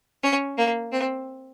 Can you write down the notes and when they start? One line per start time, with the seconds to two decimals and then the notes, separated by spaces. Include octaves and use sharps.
0.23 C#4
0.58 A#3
0.92 C4